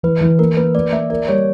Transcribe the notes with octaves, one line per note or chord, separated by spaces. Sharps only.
E3 B4
E3
A#3 A#4
A#3 B4
A#3 D5
A#3 E5
A#4 D5
G3 C#5